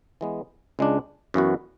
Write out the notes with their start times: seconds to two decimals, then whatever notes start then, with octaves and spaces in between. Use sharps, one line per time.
0.21 E3 G#3 B3
0.79 C#2 C#3 G#3 D4
1.34 F#2 E3 B3 F#4